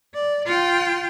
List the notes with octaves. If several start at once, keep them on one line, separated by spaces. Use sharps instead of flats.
D5
F4 G5